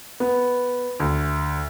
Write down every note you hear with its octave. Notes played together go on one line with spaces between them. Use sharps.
B3
D2